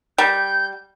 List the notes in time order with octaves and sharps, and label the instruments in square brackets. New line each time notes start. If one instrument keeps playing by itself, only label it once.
[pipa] G3 [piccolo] G6